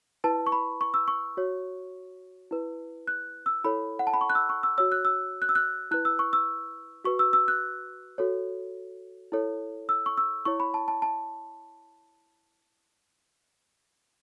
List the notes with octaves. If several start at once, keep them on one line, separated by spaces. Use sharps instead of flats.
E4 B4 A5
C#6
B5
C#6
E6
C#6
F#4 C#5
E4 B4
F#6
E6
E4 A4 C#5 B5
F#5
A5
B5
C#6
F#6
E6
C#6
E6
F#4 C#5 E6
F#6
E6
F#6
E6
F#6
E4 B4 F#6
E6
C#6
E6
F#4 B4 C#6
E6
E6
F#6
F#4 A4 C#5
E4 A4 C#5
E6
C#6
E6
E4 C#5 C#6
B5
A5
A5
A5